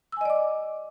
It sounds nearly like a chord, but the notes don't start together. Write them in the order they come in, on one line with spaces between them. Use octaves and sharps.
E6 G#5 D#5 D5 D6